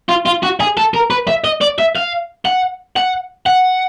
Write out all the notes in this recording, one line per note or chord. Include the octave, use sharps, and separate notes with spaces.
F4
F4
F#4
G#4
A4
A#4
B4
E5
D#5
D5
E5
F5
F#5
F#5
F#5